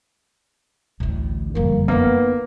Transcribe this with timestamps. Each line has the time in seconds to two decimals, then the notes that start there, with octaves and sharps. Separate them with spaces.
1.00 A1 D2 A2
1.55 F#1 F2 D3 G3 A#3
1.88 A#3 B3 C#4 D#4